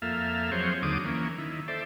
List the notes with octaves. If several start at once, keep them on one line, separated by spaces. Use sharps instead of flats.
F2 A#3 A4 E5 F5
F3 F#3 C4 G#4 C5 C#5
D#2 D3 F#3 D6 D#6
E3 A#3 C#4
D#3 E4
A4 C5 D5 E5